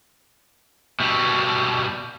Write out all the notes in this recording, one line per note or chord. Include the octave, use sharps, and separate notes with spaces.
B2 G3